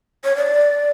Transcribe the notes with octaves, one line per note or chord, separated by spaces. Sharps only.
C#5
D5